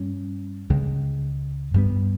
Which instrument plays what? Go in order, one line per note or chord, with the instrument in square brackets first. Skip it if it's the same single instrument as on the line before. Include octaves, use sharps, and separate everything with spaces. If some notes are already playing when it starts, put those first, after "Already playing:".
Already playing: [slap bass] G2 G3 C#4
C#2 C#3 G#3
G2 G3 B3